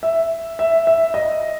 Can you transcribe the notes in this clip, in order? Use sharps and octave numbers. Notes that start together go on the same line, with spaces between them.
E5
E5
E5
D#5